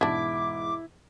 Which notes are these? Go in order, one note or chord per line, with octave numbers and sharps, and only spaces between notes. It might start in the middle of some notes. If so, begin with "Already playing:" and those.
E2 G#2 B2 D4 E4 F#4 D6